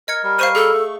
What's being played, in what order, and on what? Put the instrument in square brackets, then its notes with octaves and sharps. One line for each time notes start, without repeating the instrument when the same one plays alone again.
[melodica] A#4 [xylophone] D#5 G#6 C#7
[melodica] G3 A#4
[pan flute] C5 [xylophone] F5 C#6 D#7
[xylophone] G#4 [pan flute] A4
[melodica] A3 C#6